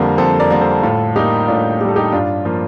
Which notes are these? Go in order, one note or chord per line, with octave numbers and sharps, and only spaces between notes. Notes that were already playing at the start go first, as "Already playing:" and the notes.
Already playing: F2 D3 G3 A#3 C5
F2 A4 C5
A#4 D5
D3 G3 A#3 D5
A4 C5
A2 F4 A4
G3 A#3 D#4 G4
A2 D4 F4
G3 A#3 G4 A4
D#4 G4
G2 D4 F4
F3 A#3